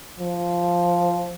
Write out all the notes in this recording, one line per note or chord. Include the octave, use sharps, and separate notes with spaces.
F3